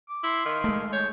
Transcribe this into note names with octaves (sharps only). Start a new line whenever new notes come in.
D6
E4 C6
D#3 F5
G#3 A3
C#5 G6